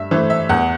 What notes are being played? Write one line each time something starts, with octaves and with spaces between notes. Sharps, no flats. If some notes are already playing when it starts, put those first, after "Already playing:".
Already playing: G2 E5
E3 A3 C5
E5
E2 F#5